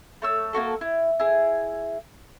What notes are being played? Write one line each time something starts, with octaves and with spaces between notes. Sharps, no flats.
A3 C#5 E6
A#3 D#4 F#4 A4
E4
E4 G#4